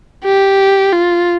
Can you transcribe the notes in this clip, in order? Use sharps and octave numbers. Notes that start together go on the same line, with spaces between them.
G4
F4